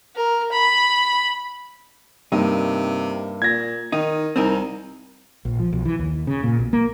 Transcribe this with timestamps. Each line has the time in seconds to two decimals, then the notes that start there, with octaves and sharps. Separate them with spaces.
0.16 A#4
0.52 B5
2.32 G2 C3 A#3 D#4
3.42 A#2 G#6 A#6
3.92 D#3 D#4
4.36 C2 C4 D#4 A#4
5.45 A#1
5.59 F3
5.73 B1
5.85 E3
5.99 D#2
6.27 C#3
6.43 A#2
6.59 B1
6.73 A#3